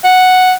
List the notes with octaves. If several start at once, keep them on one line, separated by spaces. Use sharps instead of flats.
F#5